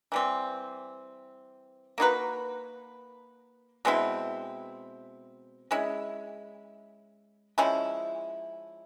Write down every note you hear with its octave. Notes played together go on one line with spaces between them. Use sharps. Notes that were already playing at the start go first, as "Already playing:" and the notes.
E3 G3 C4
A#3 D#4 F#4 B4
B2 G#3 C4 E4
G#3 C#4 E4
F3 G#3 C#4 E4